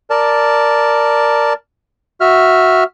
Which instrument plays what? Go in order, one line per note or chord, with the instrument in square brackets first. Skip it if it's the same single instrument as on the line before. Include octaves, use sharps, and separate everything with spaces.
[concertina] A#4 D5 A5
F#4 E5 F6